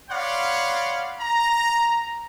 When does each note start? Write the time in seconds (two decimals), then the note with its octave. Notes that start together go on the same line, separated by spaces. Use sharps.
0.11 C#5 D5 F5 F#5 B5 C6
1.20 A#5